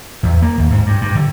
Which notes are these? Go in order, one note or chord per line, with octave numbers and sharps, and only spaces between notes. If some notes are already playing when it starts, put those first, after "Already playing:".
E2
A#3
D#2
G#2
G2
G2
D3